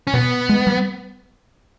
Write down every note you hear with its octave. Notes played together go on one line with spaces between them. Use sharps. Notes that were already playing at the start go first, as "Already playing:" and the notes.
C#4
B2 B3
G#3
G3